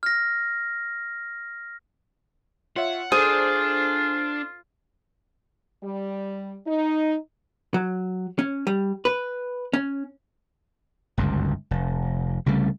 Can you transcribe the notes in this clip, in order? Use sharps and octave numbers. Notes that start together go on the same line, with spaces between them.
F6 A#6
F4 C#5 E5 F#5
D4 F4 G#4 A4 C5
G3
D#4
F#3
C#4
G3
B4
C#4
G1 C#2 F#2
F1
C2 C#3 G3 A3